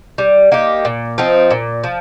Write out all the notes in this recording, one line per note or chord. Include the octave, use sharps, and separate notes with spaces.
G3
A#3 D#4 G4
A#2
F3 C4 D#4
A#2
F3